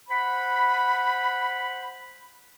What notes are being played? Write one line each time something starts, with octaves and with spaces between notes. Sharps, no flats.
C5 F#5 B5